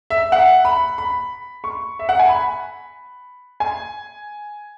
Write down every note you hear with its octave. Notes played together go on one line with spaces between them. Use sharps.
E5
F#5
B5
B5
C#6
E5
F#5
G#5
B5
G#5